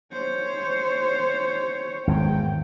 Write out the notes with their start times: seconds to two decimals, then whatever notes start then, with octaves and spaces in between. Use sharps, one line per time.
0.12 C5 C#5
2.07 G#1 E2 G5